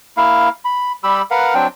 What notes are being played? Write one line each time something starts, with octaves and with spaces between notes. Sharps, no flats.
A#3 E4 F5
B5
G3 G4 B5 E6
A#4 B4 F5 F#5
F#3 C4 D4 G5